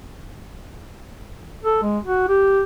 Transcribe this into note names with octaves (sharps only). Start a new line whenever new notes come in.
A4
G#3
F#4
G4